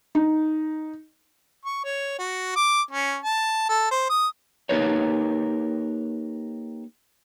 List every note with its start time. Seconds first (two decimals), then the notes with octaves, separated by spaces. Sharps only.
0.15 D#4
1.65 C#6
1.85 C#5
2.19 F#4
2.56 D6
2.91 C#4
3.22 A5
3.69 A4
3.91 C5
4.10 D#6
4.69 A#3 D#4 G4 A#4 B4 C#5